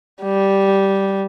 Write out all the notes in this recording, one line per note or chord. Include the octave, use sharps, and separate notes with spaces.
G3